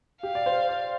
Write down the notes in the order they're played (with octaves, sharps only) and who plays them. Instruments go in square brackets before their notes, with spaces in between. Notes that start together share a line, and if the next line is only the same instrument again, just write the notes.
[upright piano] G4 [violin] F5
[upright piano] D5
C5
D5